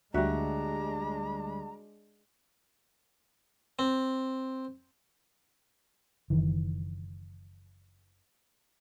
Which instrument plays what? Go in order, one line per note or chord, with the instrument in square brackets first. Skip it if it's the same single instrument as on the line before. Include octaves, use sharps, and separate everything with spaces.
[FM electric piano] D2 G3 [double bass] G#3 D4 [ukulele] F#4 E5 [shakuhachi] A#5
[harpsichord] C4
[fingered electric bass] F#1 D#3 E3